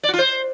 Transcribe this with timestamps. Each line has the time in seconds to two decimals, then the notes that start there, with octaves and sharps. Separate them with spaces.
0.03 D5
0.09 F#4
0.14 F4
0.19 C5